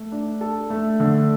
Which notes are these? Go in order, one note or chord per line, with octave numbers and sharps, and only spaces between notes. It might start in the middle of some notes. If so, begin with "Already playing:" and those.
Already playing: A3
D4
A4
A3
D3